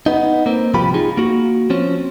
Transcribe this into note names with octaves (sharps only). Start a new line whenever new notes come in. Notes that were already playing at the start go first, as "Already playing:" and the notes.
B3 D#4
A#3 C4
C2 G#2 F3 F4 G4 B5
D#4 F4 G#4
A#3 F#4
F3 C4 C#4